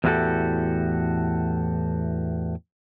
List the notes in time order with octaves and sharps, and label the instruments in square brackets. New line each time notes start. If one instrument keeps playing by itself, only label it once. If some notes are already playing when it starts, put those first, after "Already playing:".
[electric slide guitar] E2 A2 E4 F#4 G4 A4